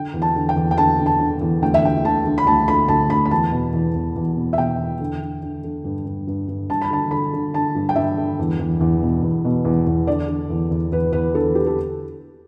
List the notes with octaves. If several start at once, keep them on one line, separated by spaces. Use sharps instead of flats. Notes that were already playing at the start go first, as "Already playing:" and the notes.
Already playing: D3 G5
E2
A5
D3
G5
E2
G5
D3 A5
D3
A5
D3
E2
D2 G5
E5
D2 G5
D3 A5
D3
B5
D2 A5
D3 B5
D2 A5
D2 B5
B5
E2 A5
B2
E2
E2
E2
B2
E5
B2 G5
E2
D3
D3
D3
D3
G2
G2
G2
G2
G2 A5
B5
D3 A5
D3 B5
D3
D3 A5
G2
G5
G2 E5
D3
E2
E2
E2
B2
E2
B2
E2
E2
D3 D5
D3
E2
E2
E2 B4
E2 B4
D3 A4
D3 G4
A4